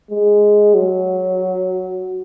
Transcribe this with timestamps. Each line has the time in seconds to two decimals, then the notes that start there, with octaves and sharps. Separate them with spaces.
0.11 G#3
0.74 F#3